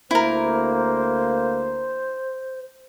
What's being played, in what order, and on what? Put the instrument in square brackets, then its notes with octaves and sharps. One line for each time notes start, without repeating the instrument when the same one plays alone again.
[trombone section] D2 A#3 [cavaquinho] E4 A#4 [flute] C5